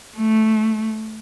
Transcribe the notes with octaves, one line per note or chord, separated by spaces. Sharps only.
A3